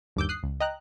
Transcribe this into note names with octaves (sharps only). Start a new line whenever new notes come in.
G1 D#2 D6 E6 G6
D#6 F#6 C7
C#2
D#5 G5 A#5 F#6